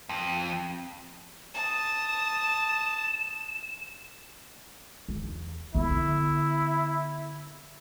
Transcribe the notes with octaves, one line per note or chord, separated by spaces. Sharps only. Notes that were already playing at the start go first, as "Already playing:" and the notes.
F2
A5 D#6 E7
E2
D3 B3 E4